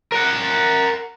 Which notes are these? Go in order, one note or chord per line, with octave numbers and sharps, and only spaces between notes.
A#4 F#5